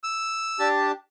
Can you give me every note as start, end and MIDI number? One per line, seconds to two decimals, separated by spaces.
0.04 0.68 88
0.59 0.92 62
0.59 0.92 67
0.59 0.92 81